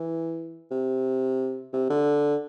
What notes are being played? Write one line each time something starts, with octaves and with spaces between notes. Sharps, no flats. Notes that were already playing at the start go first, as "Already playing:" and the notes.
Already playing: E3
C3
C3
D3